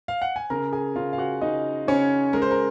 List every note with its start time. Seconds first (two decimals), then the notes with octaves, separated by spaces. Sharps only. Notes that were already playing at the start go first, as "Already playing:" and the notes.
0.08 F5
0.22 F#5
0.36 G#5
0.50 C#3 A#4 A#5
0.72 G#4 G#5
0.96 C#3 F4 F5
1.13 F5
1.18 F#4 F#5
1.41 C#3 D#4 D#5
1.87 C#3 C#4 C#5
2.33 G#3 A#4
2.42 C5
2.51 A#4